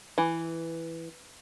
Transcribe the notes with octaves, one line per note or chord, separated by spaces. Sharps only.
E3